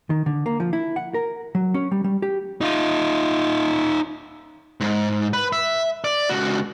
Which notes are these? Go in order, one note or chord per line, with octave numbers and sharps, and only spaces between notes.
D#3
D3
A#3
F3
E4
F#5
A#4
F#3
C#4
G3
G3
G4
D#4 F4
G#2
B4
E5
D5
C#2 F#4